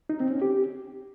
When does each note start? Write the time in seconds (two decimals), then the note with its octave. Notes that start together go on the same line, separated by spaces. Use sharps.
0.10 D#4
0.20 C4
0.31 C#4
0.42 G4